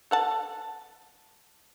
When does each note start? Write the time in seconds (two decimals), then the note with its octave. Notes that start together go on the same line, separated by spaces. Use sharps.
0.11 A4 F#5 A5